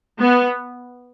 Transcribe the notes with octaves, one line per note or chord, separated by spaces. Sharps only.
B3